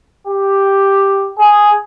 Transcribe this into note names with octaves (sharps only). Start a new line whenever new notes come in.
G4
G#4